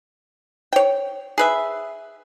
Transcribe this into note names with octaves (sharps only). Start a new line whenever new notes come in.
C#5 G5
G#4 B4 E5